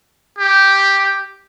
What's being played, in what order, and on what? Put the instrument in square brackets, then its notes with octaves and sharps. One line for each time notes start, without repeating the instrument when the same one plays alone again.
[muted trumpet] G4